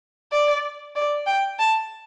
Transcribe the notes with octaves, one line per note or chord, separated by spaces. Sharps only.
D5
D5
G5
A5